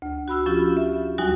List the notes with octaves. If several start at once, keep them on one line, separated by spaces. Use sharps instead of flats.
D2
F#4 B5 E6 F6
F3 C#4 F4 G4 B5
E5
D#2 F#3 G3 D#4 F#4 G#5